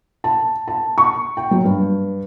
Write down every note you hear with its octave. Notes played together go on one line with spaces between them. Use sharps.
A5
A5
C#6
G5
F#3
G2